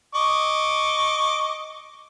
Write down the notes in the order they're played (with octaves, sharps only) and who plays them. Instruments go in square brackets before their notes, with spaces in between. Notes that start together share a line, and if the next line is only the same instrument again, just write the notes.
[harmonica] D#5 C#6 D6